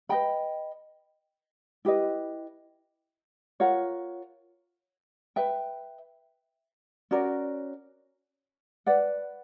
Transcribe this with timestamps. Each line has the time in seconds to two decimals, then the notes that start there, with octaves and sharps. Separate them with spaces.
0.09 B4 D#5 G5 B5
1.85 E4 G4 B4 D#5
3.60 F4 A#4 C#5 F#5
5.36 B4 E5 G5
7.11 C#4 F#4 A#4 D5
8.86 B4 D5 F#5